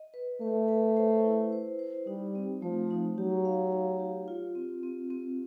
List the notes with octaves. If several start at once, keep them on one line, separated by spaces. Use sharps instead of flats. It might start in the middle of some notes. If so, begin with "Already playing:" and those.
Already playing: D#5
B4
A3 B4
B4
C5
E4
C5
C5
G3 D#4
C4
F3 A3
D#4
F#3 G4
F5
F5
G4
F4
C4
C4
C4